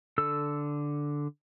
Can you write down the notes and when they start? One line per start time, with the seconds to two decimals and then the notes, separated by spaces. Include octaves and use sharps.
0.18 D3 A4 E6